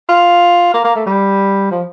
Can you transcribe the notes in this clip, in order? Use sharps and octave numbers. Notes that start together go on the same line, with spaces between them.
F4
A#3
A#3
A3
G3
F3